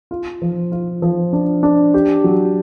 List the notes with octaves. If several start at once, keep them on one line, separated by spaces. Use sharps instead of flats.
F4
F3
F4
F3
D4
D4
G4
F#3